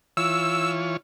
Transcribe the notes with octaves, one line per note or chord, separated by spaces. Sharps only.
E3 F4 C#5 E6